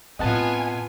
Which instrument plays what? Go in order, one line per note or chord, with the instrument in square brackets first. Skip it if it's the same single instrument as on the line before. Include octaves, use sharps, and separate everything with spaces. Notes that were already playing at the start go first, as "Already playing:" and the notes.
[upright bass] A2 C4 [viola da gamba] B3 F4 [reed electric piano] D#5 F#5 A5 [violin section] G#5